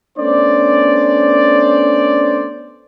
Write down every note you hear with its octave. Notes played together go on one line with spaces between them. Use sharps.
A3 B3 C#4 D4 C5 D5